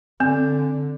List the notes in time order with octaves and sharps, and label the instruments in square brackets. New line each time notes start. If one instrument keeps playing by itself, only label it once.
[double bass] D3 [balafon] C4